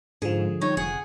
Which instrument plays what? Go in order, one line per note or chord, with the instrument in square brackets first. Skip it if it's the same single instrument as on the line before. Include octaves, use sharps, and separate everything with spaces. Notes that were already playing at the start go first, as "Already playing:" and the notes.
[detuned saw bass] G#2 [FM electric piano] D3 F3 [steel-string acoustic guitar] G#4
[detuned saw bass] G3 [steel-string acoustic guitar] D#4 [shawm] C#5
[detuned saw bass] F1 [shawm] G#4 [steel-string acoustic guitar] F#5